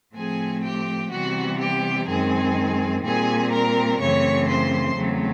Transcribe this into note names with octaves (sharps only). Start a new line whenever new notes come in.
A2 F3 A3 C4 G#4 G#5
G4 G5
C3 E3 G3 B3 F#4 F#5
G4 G5
F#2 D#3 G#3 C4 G#4 G#5
A#2 G3 C4 G#4 G#5
A#4 A#5
F#2 C#3 E3 A3 C4 C#5 C#6
C5 C6
E2 C#3 F#3 A3 C4